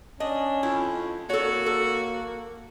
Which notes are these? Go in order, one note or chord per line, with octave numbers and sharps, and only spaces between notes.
C#4 D4 D#5
F2 E4
A#3 F#4 A4 C#5
A4